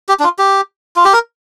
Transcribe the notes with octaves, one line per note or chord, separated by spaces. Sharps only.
G4
D4
F4
G4
F4
G4
A#4